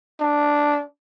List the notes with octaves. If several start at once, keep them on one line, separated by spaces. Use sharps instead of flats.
D4